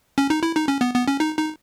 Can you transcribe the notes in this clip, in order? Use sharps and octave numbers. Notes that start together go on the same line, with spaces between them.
C#4
D#4
E4
D#4
C#4
B3
B3
C#4
D#4
D#4